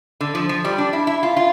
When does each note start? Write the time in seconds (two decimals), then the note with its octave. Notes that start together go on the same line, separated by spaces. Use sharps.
0.21 D3
0.35 F3
0.49 F3
0.65 G3
0.78 D4
0.93 E4
1.07 E4
1.23 F4
1.37 F4